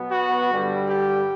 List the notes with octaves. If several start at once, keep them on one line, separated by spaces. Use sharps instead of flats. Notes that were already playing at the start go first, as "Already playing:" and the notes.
Already playing: B2 F#3 B3
F#4
G2 D3 G3
G4